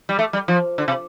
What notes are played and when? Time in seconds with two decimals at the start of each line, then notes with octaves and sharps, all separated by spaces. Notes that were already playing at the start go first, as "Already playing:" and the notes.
0.09 G3
0.19 A3
0.33 G3
0.48 F3
0.78 D3
0.88 C3